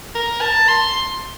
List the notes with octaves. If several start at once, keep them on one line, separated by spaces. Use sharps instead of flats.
A#4
A5
C6